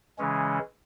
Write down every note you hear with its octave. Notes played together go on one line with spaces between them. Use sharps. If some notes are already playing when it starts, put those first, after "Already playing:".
C#3 E3 G#3 C#4